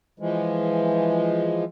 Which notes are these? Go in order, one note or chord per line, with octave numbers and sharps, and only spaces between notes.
E3 F3 G#3